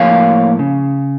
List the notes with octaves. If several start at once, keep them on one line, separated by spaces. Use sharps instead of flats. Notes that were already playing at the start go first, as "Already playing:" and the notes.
Already playing: A2 F3 A#3 C#5 F5
C#3